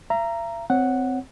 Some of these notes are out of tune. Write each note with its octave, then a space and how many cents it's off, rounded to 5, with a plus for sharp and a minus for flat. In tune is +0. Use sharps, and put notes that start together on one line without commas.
E5 +45 A#5 -5
C4 -15 C#5 +0 F#5 +0